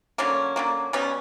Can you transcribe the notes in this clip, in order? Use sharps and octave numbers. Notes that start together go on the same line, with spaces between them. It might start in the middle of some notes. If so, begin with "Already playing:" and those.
D3 F#3 A#3 C#4
D3 F#3 A#3
B2 G3 B3 C#4